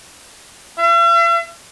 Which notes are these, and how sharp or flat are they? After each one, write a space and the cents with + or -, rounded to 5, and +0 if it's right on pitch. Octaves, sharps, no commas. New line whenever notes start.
E5 +45